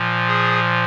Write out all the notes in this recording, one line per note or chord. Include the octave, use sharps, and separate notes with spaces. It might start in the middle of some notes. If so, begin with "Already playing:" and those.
Already playing: A#2 F3
G#4